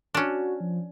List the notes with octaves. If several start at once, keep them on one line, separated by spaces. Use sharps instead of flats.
C#4 D4 F#4
F3